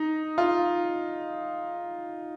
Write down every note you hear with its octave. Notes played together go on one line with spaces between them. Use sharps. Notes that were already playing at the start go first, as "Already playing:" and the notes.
Already playing: D#4
F4